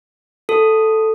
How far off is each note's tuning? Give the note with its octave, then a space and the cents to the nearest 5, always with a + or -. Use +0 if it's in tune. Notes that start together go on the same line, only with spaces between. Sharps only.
F#4 +0 A4 +0